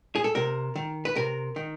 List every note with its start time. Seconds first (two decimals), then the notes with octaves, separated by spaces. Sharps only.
0.15 G#4
0.24 A4
0.35 C3 A#4
0.76 D#3
1.05 B4
1.15 C3 A#4
1.56 D#3